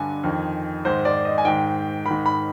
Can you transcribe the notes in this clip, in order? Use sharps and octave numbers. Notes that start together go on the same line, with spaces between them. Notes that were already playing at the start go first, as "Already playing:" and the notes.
Already playing: G2 D3 G#5
F2 D#3
G#2 D#3 C5
D5
D#5
G#5
G#2 D#3 G5
G#2 D#3 B5
B5